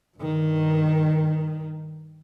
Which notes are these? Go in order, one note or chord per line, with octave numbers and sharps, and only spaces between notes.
G2 D#3